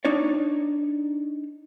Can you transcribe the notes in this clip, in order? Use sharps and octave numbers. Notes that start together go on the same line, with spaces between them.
D4 D#4 C#5 D5